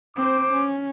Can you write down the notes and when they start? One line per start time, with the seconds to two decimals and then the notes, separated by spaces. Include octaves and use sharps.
0.16 C4 C5 D6
0.53 C#4